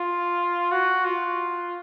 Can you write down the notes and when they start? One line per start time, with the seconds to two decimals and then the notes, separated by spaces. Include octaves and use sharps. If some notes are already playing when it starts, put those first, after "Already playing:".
Already playing: F4
0.72 F#4
1.05 F4